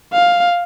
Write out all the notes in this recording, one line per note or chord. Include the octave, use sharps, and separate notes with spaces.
F5